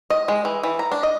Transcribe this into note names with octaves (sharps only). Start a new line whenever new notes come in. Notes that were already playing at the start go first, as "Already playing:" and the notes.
D#5
G#3
E3
E3
A#5
D4
D#5